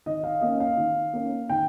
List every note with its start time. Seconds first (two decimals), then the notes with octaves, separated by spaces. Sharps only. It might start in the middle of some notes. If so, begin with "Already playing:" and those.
0.06 D#3 D#5
0.24 F5
0.41 A#3 C#4 D#5
0.60 F5
0.77 D#3
1.13 A#3 C#4
1.49 D#3 G5